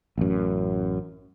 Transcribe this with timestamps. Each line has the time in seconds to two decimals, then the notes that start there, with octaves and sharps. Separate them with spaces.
0.18 A1 F#2